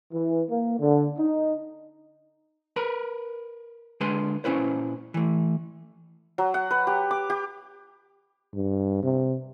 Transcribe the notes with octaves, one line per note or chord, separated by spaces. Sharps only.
E3
A#3
D3
D#4
A#4 B4 A#5 B5
D3 G#3 B4 G#5 C6
A#2 C#4 E4 B4 C5
E3 A3
F#3
F#5
B4
G4
D6
G4
G2
C3